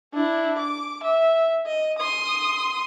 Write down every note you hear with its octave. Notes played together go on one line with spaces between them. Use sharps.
D4 E4
D6
E5
D#5
C6 D#6